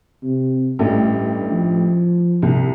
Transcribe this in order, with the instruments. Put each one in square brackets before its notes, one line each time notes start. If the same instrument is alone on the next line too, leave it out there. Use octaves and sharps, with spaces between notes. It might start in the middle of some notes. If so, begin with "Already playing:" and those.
[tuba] C3
[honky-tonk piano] A1 G3 A3 [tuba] G2
[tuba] F3
[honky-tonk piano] C2